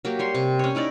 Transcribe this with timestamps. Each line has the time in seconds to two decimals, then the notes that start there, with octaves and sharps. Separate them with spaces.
0.05 F#3 A#3 G4
0.19 G3 C#5 C6
0.35 C3
0.59 C#4 C#5
0.75 D#4 E4 A#4 D5